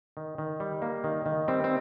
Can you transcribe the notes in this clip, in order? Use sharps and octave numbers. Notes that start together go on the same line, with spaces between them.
D#3
D#3
G3
A#3
D#3
D#3
G3 C4
C4